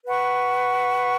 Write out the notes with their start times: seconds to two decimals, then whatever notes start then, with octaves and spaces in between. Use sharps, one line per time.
0.05 B4 F#5 C#6